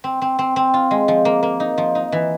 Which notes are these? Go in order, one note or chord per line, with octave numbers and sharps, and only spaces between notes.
C4
C4
C4
C4
F4
G#3
F3
A#3
A#3
D#4
F3
D#4
E3